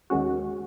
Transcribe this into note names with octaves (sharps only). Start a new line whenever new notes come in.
D#2 D#3 G#3 C#4 F#4